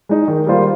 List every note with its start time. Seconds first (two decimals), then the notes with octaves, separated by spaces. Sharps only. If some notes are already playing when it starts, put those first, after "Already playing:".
0.09 G#3 D#4
0.28 D#3
0.47 G3 A#3 F4 C5